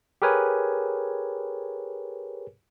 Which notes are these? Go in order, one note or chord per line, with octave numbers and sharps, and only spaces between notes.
G4 G#4 A#4 B4 C#5 G#5